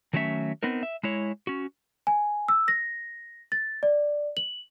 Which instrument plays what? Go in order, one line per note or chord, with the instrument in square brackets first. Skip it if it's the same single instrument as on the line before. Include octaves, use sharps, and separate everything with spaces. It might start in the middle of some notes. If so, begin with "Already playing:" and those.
[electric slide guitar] D#3 F#3 A3 C#4 E5
B3 C4 D#4 A#4
E5
G#3 E4 C#5
C#4 F#4
[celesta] G#5
E6
A#6
A6
D5
F#7